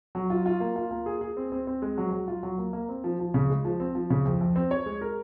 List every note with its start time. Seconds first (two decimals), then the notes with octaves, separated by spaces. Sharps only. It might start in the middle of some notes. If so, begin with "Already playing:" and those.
0.15 F#3
0.30 F4
0.46 F4
0.60 A#3
0.76 F4
0.91 A#3
1.06 G#4
1.21 G#4
1.37 C4
1.52 C4
1.67 C4
1.82 G#3
1.98 F#3
2.12 F#3
2.28 F4
2.43 F#3
2.58 A#3
2.73 A#3
2.89 C4
3.04 F3
3.19 F3
3.34 C#3
3.50 G#3
3.65 F3
3.80 C4
3.95 F3
4.10 C#3
4.25 F2
4.41 F2
4.56 C4
4.71 C#5
4.86 G#3
5.01 A#4